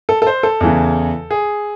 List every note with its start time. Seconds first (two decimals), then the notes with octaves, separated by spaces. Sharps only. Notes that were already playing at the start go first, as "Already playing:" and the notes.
0.09 A4
0.22 A4
0.27 C5
0.43 A4
0.61 E2 C#3 E3
1.31 G#4